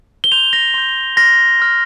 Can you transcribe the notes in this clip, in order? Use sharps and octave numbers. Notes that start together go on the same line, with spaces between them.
G7
C6 G6 F7
A#6
C6 G6
C6 F6 A#6
C6 F6